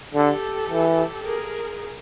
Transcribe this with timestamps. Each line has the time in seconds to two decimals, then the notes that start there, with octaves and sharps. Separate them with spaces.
0.14 D3 G4 A4
0.70 E3
1.24 G#4 A#4